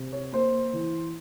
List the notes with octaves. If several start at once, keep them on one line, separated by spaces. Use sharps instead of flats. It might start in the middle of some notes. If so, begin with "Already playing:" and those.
Already playing: C3
C#5
A#3 C5
E3